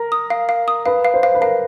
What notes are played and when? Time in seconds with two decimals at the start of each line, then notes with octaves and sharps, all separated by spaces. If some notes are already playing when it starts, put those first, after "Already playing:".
Already playing: A#4
0.12 D#6
0.30 F5
0.49 F5
0.68 D#6
0.86 B4 F5
1.05 F5
1.14 C5
1.23 F5
1.35 B4
1.41 A#4 F5